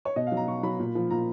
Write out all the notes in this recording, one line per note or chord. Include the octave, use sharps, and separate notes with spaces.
C#5
B2 D#5
F5
F#3
A#5
B2 C#6
F#3 B5
A#2
F3
A#2 A#5